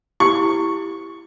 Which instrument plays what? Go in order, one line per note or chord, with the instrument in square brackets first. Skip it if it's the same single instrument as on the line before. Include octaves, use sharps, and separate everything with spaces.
[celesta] E4 G4 [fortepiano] C#6